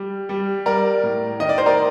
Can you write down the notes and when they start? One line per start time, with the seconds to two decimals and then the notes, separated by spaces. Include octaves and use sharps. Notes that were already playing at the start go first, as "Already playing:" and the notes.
Already playing: G3
0.29 G3
0.66 G3 A#4 D5
1.03 A2
1.40 D#3 D#5
1.49 D5
1.58 C5
1.66 A#4 D5